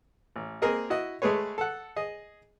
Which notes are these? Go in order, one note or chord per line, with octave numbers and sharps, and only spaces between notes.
A1
A#3 C4 G#4 A#4 D#5
E4 F#4 D#5
G#3 A3 G#4 B4 C#5
A4 F#5
G#4 D#5